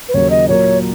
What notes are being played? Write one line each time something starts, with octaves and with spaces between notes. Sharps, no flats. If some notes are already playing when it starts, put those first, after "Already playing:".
B4
D#2 C#3 F#3 C#5
D#5
A#2 F#3 A#3 C#5